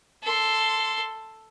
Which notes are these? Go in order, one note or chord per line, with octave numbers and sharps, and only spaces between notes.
A4 C6